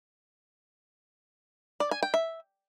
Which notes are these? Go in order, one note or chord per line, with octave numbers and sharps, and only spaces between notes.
D5
G#5
G5
E5